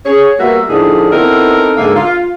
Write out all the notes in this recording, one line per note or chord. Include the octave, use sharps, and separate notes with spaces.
G#4 C#5
G3 A#3 B3 F#4 A#4 E5
A2 D3 F3 D4 D#4 G#4
B3 C4 D#4 E4 A4 A#4
G#2 D3 A#3 A#4 E5 F5
F4